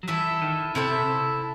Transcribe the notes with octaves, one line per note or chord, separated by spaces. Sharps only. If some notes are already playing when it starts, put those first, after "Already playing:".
F#3
E3 E4 A4 E5
D#3
C3 E4 A4 E5